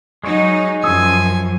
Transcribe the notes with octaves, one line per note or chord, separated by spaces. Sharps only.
F#3 G#3 D#4 C#5
F#2 F3 G#5 D#6 E6